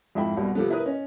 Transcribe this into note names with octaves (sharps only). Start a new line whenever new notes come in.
F2 G#2 E4 E5 G5 B5
C2 B2 G3
C3 F3 A3 B3
E4 A#4 B4 D#6
C#4 D#5